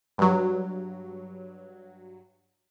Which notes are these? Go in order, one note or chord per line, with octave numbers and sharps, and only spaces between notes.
G2 F#3